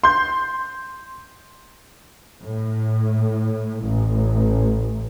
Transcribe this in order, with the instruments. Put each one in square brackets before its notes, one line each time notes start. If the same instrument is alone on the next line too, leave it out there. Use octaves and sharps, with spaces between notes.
[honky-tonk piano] C6 G6
[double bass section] A2
A1